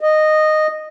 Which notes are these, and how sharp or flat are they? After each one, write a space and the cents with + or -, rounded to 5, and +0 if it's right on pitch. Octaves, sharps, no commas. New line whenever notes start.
D#5 -10